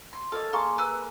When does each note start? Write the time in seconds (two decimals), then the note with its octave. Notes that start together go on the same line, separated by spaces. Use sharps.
0.13 C6
0.32 A#3 A4 C#5 D#5 F5
0.53 A#3 G#4 A#4 F5 C6 C#6
0.78 B4 E6 F#6